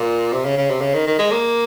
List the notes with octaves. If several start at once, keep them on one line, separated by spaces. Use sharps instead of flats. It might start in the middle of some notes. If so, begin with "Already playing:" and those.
Already playing: A#2
C3
C#3
C#3
C3
C#3
D#3
D#3
G#3
A#3